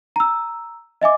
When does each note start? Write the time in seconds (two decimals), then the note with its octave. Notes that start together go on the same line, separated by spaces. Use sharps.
0.16 A#5 E6
1.02 D#5 E5 G#5 D6